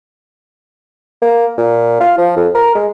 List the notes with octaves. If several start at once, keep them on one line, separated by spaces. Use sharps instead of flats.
A#3
A#2
F4
F3
F2
A#4
G#3